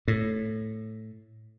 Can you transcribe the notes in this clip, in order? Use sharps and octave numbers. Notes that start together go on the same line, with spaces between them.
A2